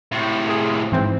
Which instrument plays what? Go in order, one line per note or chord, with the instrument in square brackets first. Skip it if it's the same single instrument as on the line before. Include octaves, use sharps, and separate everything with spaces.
[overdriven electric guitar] A2 C3
[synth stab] G#4
G#2 E3 C4